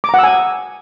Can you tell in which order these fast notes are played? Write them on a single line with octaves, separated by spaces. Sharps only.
D6 A#5 F#5 E6 G#5